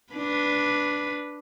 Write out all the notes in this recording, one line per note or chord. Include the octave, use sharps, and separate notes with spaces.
D4 B4